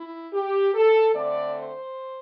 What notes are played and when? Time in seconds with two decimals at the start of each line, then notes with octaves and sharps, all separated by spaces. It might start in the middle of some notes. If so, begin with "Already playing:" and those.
Already playing: E4
0.33 G4
0.74 A4
1.15 D3 A3 C4 D5
1.55 C5